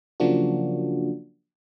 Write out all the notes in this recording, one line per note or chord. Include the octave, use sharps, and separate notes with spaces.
C#3 F3 F#3 A#3 D4 F#4